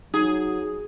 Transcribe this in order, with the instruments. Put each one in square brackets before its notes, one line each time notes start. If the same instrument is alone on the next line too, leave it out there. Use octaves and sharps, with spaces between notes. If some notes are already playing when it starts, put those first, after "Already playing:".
[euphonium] F#3 [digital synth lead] D#4 [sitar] G#4